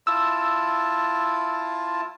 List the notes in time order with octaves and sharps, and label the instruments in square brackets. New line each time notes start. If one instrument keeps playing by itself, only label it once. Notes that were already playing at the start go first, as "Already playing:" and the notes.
[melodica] E4 F4 A5 [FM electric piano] E6